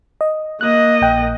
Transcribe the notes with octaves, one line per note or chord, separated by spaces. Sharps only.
D#5
A#3 D#5 F#6
A#1 G5 F#6